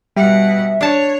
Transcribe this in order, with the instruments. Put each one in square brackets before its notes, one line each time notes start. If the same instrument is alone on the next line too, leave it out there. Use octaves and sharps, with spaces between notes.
[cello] B2 F#5 [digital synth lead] G3 [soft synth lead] E5
[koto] D4 A5 [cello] C#5